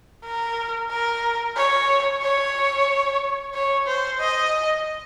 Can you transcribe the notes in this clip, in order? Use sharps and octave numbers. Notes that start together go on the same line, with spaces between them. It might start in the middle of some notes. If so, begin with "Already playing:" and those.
A#4
A#4
C#5
C#5
C#5
C5
D#5